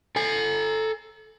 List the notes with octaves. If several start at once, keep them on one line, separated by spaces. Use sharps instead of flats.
A4 G#5